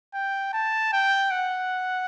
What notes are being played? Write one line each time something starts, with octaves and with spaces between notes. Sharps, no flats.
G5
A5
G5
F#5